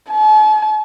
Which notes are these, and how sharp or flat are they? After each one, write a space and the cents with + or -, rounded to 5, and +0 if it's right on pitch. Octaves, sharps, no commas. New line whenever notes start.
A5 -45